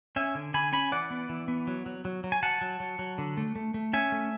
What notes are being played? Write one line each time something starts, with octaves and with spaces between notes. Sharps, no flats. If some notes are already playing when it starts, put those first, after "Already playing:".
C#4 E5 G#5
D3
D3 G#5 B5
C#4 G#5 B5
E3 D5 F#5
B3
E3
B3
F#3
F#3
F#3
F#3
G#5
F#3 F#5 A5
F#3
F#3
F#3
D3
A3
A3
A3
C#4 E5 G#5
A3